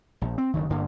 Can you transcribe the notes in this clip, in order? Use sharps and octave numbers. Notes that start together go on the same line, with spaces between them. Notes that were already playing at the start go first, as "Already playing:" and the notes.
A#1
C4
F#1 D2 D#3
G1 G2 D3 A#3